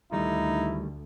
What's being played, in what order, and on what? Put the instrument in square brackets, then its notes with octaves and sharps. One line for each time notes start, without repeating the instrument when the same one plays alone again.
[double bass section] D2 [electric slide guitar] D#3 G3 A3 [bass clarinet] D#4 [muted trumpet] E4